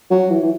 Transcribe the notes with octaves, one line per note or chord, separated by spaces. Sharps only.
F#3
E3
E3